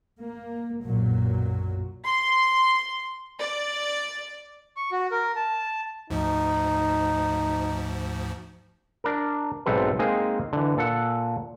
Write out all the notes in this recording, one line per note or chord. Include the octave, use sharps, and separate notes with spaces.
A#3
B1 F#2 A#2 F#3
C6
D5
C#6
F#4
A#4
A5
D2 G#2 F3 D#4
D4 A#4
B1 G#2 C4 A4 B4
G#3 A#3 C4 D#4 G#4
D3 E3
A#2 A4 F#5 A5